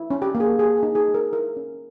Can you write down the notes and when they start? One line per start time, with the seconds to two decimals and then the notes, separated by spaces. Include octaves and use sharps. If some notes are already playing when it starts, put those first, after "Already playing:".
Already playing: E4
0.10 C#4
0.22 G4
0.35 A#3
0.40 G#4
0.59 G4 G#4
0.77 G#4
0.83 D#4
0.95 G#4
1.08 G#3
1.14 A#4
1.32 E4 A#4
1.57 C#4